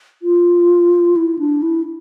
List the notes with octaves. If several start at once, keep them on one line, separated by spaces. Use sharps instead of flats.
F4
E4
D4
E4